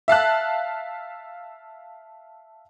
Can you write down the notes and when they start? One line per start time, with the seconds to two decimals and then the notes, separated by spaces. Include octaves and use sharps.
0.08 E5 F5 A5 F#6